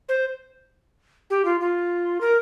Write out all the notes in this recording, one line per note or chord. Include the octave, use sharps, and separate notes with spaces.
C5
G4
F4
F4
A#4